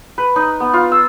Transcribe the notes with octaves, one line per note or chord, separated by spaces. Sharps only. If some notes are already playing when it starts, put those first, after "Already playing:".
B4
D#4
B3
F4
E6